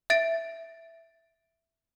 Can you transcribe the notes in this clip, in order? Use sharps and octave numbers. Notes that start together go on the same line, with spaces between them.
E5 A6 D7